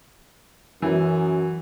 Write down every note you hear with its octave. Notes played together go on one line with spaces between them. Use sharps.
F#2 E3